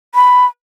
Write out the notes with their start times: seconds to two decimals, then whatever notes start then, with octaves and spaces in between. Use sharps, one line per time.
0.15 B5